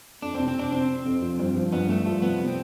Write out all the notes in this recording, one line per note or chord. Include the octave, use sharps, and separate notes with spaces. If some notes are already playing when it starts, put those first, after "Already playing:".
F2 D4
C4
C3
C4
C3 D4
C3 C4
C3
F2
F3
G2
F3
G2 B3
G2 A3
F3 A3
C3 B3
C3
C4